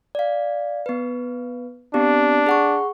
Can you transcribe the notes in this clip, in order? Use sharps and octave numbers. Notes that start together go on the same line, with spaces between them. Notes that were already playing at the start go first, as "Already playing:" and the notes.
D5 F5
B3 B4
B3 C4 D4 G4
G#4 F#5 C#6